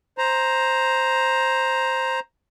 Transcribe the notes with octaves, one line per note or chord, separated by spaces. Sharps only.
C5 A#5